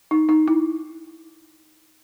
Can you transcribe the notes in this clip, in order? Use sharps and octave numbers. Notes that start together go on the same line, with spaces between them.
D#4
D#4
E4